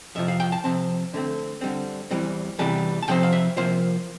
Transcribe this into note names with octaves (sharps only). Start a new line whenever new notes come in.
F2 C3 F3 E5
F5
G5
A5
C3 F3 C4 A5
D3 A3 C4
D3 G3 C4
E2 E3 G3 C4
E2 C3 E3 G3 A5
A5
C3 F3 C4 G5
F5
E5
C3 F3 A#3 C5